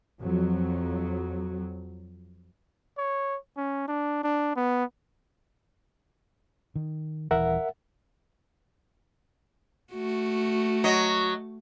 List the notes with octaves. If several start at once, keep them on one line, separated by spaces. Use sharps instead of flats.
F2 F#3
C#5
C#4
D4
D4
B3
D#3
D#1 E3 A#4 E5 F#5
A3 F#4
F#3 D#5